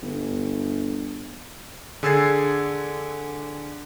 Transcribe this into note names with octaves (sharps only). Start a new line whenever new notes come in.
G1
D3 G#4 E6 G#6 A6 C7